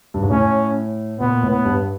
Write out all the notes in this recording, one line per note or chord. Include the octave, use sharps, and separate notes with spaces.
G2
G#2
A2 C#4
A#2 B3
A2
B3
G2